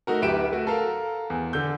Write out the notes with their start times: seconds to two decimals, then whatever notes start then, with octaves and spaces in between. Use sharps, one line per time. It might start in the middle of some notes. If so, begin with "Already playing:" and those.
0.07 A3 D#4 F#4 A#4
0.22 D1 G4 B4 E5 D7 E7
0.52 A3 F#4
0.67 A4 A#4 F5
1.30 E2
1.53 D3 G6